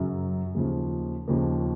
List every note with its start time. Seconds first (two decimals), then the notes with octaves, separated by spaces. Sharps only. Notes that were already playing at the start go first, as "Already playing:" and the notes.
Already playing: F#2 C#3 F#3
0.54 D#2 C#3 F3
1.28 D#2 C#3 F3 A#3